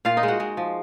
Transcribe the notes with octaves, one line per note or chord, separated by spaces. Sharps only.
A#2 F4 F5
D#4 D#5
G#3
F#4 F#5
G#3
F3